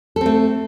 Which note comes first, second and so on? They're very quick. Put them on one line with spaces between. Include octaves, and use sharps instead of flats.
A4 C4 A3